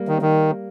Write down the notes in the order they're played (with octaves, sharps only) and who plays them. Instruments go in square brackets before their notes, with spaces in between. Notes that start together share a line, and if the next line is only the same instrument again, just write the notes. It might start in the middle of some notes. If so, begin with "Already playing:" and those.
Already playing: [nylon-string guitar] G3 A#3
[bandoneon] D#3
D#3